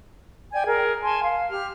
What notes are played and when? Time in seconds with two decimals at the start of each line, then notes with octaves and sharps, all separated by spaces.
0.53 D5 G5 G#5 G#6
0.65 G#4 A#4
1.03 G#5 A5 C6
1.23 F5
1.50 G4 F6